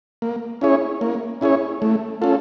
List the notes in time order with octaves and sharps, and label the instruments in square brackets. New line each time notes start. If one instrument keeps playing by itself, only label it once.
[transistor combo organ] A#3
C#4 E4 G#4 C#5
A#3
C#4 E4 G#4 C#5
A3
C#4 F4 A4